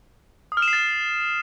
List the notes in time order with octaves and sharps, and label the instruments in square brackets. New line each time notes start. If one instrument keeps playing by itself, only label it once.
[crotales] D#6
F6
E7
C7
A6